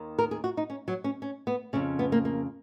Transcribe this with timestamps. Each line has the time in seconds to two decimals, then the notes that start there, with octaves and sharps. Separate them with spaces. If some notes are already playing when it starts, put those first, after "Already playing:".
Already playing: D#2 D#3
0.19 A#4
0.31 G#4
0.44 F#4
0.57 D#4
0.70 C#4
0.88 F#3
1.04 C#4
1.22 C#4
1.47 B3
1.73 F2 C#3 C#4
1.99 B3
2.12 A#3
2.25 A#3